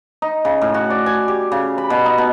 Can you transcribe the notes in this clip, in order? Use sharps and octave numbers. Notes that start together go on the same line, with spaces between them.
D#4
C#3
A2
F#4
D5
G#5
G4
C#3
B5
B2
D#4
B2